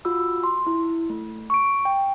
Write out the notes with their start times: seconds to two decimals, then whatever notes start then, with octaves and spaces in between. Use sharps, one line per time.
0.05 F4 F#4 B5 E6
0.43 C6
0.67 E4
1.10 A3
1.50 C#6 D7
1.85 G5